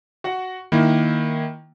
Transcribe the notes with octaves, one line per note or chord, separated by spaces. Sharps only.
F#4 F#5
D#3 A#3 E4